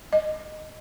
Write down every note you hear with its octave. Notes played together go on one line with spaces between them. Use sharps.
D#5